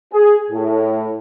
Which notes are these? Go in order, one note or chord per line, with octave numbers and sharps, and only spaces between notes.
G#4
A2